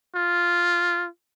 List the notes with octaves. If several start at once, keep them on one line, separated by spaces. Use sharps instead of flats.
F4